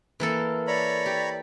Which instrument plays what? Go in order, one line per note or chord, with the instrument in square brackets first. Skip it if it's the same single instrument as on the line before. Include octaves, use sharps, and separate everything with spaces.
[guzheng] E3 A#3 A4
[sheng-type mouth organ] C#5 A#5 B5 [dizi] D5
[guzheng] G4